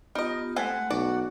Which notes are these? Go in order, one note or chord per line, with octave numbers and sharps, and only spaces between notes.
B3 D#4 F4 G4 D#5
G#3 A3 C4 A4 F#5 G#5
B1 F#4 D5